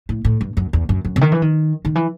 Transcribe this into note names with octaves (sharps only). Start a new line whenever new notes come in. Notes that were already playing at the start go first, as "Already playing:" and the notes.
A2
A2
G2
F#2
E2
F#2
F#2
C3
D#3
E3
D#3
D#3
E3